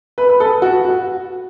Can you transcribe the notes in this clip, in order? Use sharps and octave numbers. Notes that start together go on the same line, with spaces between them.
B4
B4
A4
F#4
F#4